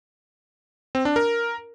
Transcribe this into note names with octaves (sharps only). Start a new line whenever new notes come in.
C4
D4
A#4